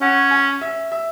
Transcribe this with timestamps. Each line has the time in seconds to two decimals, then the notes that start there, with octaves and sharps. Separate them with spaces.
0.01 C#4 F#5
0.31 G#5
0.61 E5
0.92 E5